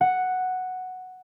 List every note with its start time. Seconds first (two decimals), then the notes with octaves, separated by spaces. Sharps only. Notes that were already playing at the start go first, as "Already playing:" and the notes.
0.01 F#5